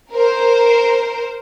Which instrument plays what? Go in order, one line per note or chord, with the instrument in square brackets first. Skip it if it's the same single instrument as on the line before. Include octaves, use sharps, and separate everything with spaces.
[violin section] A#4 C5